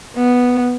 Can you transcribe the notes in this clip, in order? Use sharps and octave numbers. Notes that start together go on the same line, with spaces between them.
B3